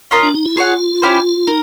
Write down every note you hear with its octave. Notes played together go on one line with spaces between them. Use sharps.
C#4 F4 A#4 D#5
D4
D#4
E4
F4 G#4 C#5 F#5
C#4 E4 G4 C5
D#4 A#4